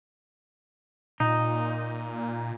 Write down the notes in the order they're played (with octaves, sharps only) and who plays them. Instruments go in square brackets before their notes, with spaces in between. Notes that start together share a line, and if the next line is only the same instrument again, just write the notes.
[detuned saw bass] A#2 [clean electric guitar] D#4